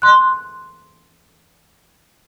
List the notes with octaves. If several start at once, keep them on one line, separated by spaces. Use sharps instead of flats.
C6 F#6